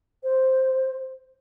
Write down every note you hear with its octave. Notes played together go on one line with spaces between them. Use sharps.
C5